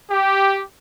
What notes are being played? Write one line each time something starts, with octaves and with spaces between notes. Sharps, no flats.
G4